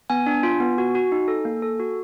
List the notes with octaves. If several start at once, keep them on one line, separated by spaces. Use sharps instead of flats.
B3 G#5
D4
F4
B3
F#4
F#4
D#4
A4
A#3
A4
F#4